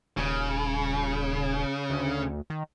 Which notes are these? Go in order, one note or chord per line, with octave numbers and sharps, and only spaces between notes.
D#1 C#3
D2
D#3